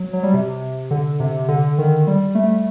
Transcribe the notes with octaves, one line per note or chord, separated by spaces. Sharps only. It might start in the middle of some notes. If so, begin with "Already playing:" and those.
Already playing: F#3
F#3
G3
C3
D3
C3
D3
D#3
G3
A3